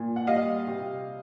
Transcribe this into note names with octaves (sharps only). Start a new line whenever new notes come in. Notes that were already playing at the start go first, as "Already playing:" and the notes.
Already playing: A#2
F#5
G3 D#5 F5
C3